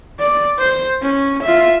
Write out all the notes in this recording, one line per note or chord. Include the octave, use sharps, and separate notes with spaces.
D5
C5
C#4
F4 E5